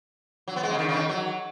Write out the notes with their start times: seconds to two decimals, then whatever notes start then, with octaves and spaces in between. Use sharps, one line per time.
0.48 F#3
0.56 B3
0.63 G#3
0.71 C#3
0.79 D#3
0.89 C#3
0.93 D#3
1.09 F#3